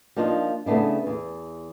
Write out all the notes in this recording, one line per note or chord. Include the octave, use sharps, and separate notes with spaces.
F3 A#3 D4 D#4 F4
C#3 A3 B3 D4 E4
E2